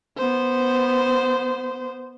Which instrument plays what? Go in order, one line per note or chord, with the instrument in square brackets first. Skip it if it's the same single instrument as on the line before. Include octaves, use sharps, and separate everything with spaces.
[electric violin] B3 C5